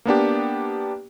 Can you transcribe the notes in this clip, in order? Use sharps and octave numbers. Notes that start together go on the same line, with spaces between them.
A#3 B3 D4 G4